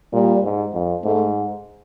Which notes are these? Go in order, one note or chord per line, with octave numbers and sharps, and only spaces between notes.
A#2 G3
G#2
F2
G#2 A3